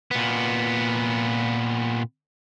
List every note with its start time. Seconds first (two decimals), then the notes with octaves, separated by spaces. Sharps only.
0.11 A#2 B3